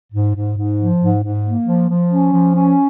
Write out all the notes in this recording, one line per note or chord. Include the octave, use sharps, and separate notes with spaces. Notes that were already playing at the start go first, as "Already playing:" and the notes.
G#2
G#2
G#2
F3
G#2
G#2
A#3
F3
F3
C#4
F3
C#4